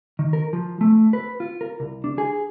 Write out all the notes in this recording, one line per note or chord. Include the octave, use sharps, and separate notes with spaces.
D#3
A#4
F3
A3
B4
F4
A#4
C2
D4
G#4